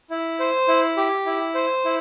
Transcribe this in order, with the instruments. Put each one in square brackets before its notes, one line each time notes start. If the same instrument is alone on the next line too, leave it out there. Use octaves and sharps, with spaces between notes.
[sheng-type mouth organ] E4
C5
E4
G4
E4
C5
E4